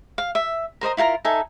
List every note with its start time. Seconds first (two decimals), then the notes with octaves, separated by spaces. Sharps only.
0.18 F5
0.35 E5
0.81 A#4 C5 D#5 A#5
0.97 E4 F4 A#4 A#5
1.25 D#4 A4 E5 G#5